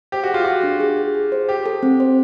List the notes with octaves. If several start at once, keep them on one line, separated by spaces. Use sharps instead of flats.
G4 C5
F#4
F4 G#4
F#4 G#4
D4
G#4
G#4
G#4
C5
G4 C5
A4
C4
C5